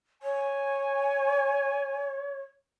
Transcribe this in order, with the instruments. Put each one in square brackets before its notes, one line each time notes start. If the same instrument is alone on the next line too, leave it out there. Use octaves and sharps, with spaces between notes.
[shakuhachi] C#5 [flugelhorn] G#5